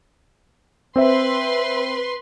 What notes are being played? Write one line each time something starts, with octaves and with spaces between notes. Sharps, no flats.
C4 B4 C5 E5 C6